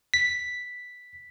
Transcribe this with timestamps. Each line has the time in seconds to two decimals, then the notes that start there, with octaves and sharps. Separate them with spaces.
0.14 B6